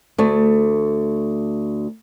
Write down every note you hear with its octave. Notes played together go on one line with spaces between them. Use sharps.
D2 A3